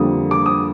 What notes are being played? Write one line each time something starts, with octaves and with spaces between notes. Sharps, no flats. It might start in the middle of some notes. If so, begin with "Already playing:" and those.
Already playing: F2 D3 G3 A#3 D#6
D6
D#6